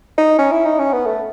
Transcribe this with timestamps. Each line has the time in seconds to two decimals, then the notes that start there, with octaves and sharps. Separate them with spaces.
0.18 D#4
0.38 C#4
0.52 E4
0.65 D#4
0.79 C#4
0.93 B3
1.06 A3